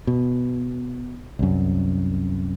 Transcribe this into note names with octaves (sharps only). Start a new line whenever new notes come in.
B2
C2 F#2